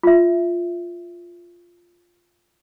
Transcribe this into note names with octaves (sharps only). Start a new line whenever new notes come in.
F4 E5